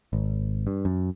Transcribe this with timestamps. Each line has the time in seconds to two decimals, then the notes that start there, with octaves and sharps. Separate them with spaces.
0.13 G#1
0.67 G2
0.85 F#2